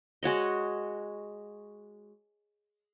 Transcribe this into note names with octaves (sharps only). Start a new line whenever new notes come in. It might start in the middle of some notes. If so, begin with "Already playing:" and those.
G#3 F#4 C#5 D#5